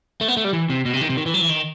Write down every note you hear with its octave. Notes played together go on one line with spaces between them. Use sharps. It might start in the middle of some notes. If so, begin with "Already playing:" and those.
A3
B3
A3
G3
E3
C3
B2
C3
D#3
C3
D#3
E3
F#3
E3
D#3